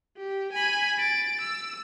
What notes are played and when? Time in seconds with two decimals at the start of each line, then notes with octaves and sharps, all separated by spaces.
0.18 G4
0.53 G#5 B5
0.98 A6 D7
1.41 E6